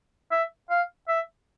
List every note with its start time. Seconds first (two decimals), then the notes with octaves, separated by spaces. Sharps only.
0.31 E5
0.70 F5
1.08 E5